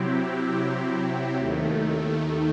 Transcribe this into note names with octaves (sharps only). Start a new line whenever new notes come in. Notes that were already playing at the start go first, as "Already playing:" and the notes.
Already playing: C3 F#3 C4 E4 G4
D#2 D#3 A3